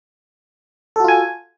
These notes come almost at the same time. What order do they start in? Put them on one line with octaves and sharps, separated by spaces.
A4 F#4 F4 G#5